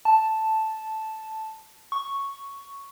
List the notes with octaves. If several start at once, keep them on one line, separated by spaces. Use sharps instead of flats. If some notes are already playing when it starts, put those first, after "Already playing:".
A5
C#6